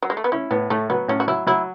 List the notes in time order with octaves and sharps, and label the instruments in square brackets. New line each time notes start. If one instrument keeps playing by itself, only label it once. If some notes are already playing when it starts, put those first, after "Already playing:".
[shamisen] F#3
G#3
A3
B3
[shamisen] C#4 [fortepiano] E4
[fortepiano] A2 [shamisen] B3
[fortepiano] A2 [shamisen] A3
[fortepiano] F#3 [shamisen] B3
[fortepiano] A2 [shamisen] C#4
[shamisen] F#4
[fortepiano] F#3 [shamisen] E4
[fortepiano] F#3 [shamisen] E4